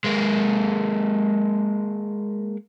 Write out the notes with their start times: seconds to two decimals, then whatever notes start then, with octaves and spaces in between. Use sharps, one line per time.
0.04 G#3 A#3